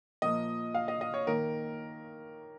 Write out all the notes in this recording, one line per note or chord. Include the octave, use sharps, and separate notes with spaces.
A#2 F3 A#3 D#5
F5
D#5
D#5
C#5
D#3 A#3 A#4